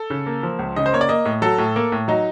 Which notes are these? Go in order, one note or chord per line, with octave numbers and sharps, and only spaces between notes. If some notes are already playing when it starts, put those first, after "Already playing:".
Already playing: A4
C#3
A#3
F3
C#2
C#3 D#5
C5
A#3 C#5
D5
A#3 D#5
A2
F#3 A4
A2
A#3
A2
F#3 D#4